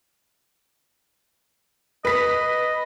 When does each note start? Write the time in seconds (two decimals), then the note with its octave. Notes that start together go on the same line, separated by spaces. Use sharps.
2.05 B4 D#5 B6